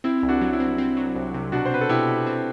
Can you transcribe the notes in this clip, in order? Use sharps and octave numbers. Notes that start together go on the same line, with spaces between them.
C4 E4
C2
D4 F#4
F#3
E4
C4
C4
F#3
C2
C3
B2 D4 F#4
C5
C4 B4
A4
B2 E4 G4
B2
C4